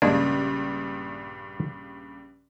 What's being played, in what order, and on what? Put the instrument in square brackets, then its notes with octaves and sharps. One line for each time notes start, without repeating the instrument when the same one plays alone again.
[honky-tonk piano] A#1 G2 C#3 [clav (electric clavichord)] G#3 A#3 D4